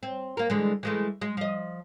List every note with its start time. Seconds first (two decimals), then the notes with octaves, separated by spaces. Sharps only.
0.03 C4
0.37 A#3 A#4
0.50 D3 E3 G#3
0.83 E3 G#3 A3
1.21 G#3
1.37 F3 D#5